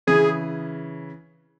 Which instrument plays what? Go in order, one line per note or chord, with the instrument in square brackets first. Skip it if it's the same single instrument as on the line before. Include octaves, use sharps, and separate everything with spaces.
[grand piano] C#3 E3 [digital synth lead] G#4